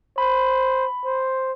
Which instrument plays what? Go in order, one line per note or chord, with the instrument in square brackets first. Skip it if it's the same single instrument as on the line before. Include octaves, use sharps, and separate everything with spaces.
[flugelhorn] C5 [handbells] B5
[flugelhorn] C5